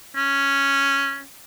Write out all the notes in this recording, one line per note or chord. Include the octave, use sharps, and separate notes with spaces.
C#4